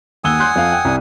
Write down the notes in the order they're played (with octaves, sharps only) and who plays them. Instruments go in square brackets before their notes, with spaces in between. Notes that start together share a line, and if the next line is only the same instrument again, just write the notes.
[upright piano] D#2 E6 G7 [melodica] F#5 G#5 D#6
[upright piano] C6 F#6 G6
F2 F5
G5
C2